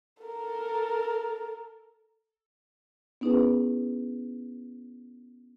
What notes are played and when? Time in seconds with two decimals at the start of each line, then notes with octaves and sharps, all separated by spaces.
0.23 A4 A#4
3.21 B3 C#4 D#4 E4 G#4 B4